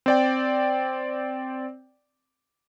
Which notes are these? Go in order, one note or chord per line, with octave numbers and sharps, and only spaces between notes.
C4 D5 G5